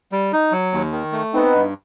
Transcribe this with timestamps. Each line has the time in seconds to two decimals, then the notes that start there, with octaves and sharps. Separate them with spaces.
0.12 G3
0.33 D#4
0.52 F#3
0.73 D#2
0.92 D#3
1.12 A3
1.33 B3 C4 D#4
1.53 G2